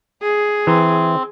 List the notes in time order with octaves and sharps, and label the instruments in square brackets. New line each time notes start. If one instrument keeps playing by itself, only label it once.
[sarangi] G#4
[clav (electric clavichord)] E3 E5 A#5 [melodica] C4